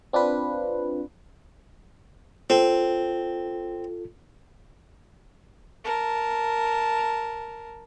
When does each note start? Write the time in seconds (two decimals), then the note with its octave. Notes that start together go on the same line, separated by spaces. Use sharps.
0.13 C4 D4 F4 B4
2.50 C4 F4 A4
5.84 A#4 A5